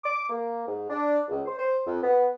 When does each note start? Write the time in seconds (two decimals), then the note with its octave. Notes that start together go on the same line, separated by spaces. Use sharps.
0.03 D6
0.30 A#3
0.67 G#2
0.89 D4
1.28 C#2
1.45 C5
1.57 C5
1.85 F2
2.02 B3